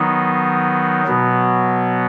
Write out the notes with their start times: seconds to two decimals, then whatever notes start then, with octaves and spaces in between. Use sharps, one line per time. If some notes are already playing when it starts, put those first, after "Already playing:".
Already playing: D#3 F#3 B3 D#4
1.06 B2 F#3 B3